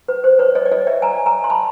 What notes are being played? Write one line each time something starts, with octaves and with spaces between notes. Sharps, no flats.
B4
C5
B4 C#5
C#5 D#5
D5
C#5 D#5
D5 E5
G#5 A#5
G#5 A#5
C6
A5 B5